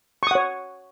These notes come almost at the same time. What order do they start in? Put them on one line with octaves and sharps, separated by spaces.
C#6 D#6 F#5 C#5